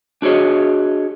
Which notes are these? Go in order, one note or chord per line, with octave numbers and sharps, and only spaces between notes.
D4 F#4 G#4 C#5 D#5